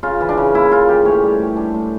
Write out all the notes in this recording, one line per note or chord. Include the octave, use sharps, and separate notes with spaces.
C#3 F4
E3
D4
C#3
A#3 E4
C#3 F4
E3 G4
A2 C#5
G3
A2
D4
A2